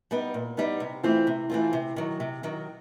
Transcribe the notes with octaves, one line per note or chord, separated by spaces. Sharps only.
G3 B3 D#4
A#2
G3 B3 D#4
C3
E3 A3 C4 F4
C3
E3 A3 C4 F4
C3
D#3 F#3
C3
D#3 F#3